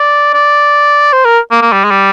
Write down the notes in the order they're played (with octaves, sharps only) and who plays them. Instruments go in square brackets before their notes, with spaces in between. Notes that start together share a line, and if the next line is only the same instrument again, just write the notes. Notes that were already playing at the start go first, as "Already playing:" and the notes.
Already playing: [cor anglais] D5
D5
C5
A#4
A#3
A#3
G3
G#3
G3